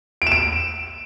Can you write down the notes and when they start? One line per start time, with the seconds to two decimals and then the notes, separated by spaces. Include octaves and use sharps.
0.22 D7
0.27 E7
0.32 D7